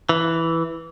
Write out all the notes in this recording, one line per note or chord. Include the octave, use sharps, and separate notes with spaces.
E3